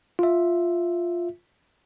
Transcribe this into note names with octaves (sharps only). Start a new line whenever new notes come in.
F4 E5